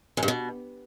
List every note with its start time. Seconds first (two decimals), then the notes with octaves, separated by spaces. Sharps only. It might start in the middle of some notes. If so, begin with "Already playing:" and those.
0.17 F#2
0.23 G2
0.28 B2